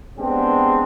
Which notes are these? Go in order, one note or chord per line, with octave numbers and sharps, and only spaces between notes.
G#3 B3 C4 D4 G4